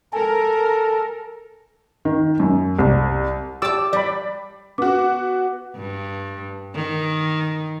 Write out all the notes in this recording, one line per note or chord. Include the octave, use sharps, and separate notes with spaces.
A4 A#4 G#5
D#3
F#2
C2
G4 D5 A5 D6 E6
G3 D5 B5
B3 F#4 D6
G2
D#3